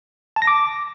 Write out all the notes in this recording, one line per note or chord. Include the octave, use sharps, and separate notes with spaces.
A5
A#6
D6